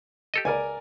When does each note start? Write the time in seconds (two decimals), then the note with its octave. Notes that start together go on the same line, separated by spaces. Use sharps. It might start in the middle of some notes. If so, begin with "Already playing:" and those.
0.34 G4 A4 D#5
0.45 C#2 A#4 D5 G#5